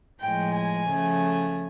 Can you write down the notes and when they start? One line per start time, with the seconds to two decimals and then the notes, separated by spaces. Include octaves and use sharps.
0.21 A2 F3 G#3 G5
0.55 G#5
0.88 C#3 F3 A3